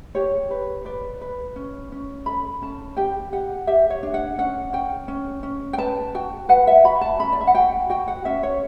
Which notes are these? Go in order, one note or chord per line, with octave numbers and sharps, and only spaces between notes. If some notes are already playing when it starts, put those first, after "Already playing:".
G4 C#5
B4
B4 D5
B4
C#4
C#4
A4 B5
C#4 A5
G4 G5
G4 F#5
G4 E5
C#5
D4
F#5
C#4 F#5
C#4 G5
C#4
C#4
G5
B4 A5
F#4 G5
B4 F#5
E5
F#4 B5
A5
C#4 B5
D5
E5
F#5
F#4 G5
F#4 G5
F#5
C#4 E5
C#5